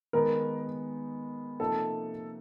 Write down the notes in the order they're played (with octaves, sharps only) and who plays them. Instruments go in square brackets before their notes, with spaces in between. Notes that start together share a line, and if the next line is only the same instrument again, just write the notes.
[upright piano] D#3 G#3 B3 D#4 [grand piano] A#4
[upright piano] C3 F3 A#3 D#4 [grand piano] A4